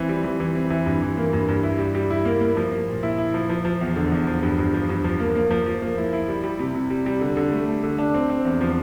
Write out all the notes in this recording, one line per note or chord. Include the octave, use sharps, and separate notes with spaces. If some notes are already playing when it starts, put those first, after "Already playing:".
Already playing: E3 C4
G3
E3
E3
C4
E3
G2
E3
A#3
G2
G2
E4
G3
G3
E4
A#3
A#3
F3
A#3
A#2
E4
E4
F3
F3
F3
E2
D3
E2
F3
G2
G2
F3
G2
F3
A#3
A#3
F3
F3
A#3
E4
E4
G3
G3
C3
C3
G3
G3
D3
D3
A3
A3
D3
D4
C4
C4
E2
F3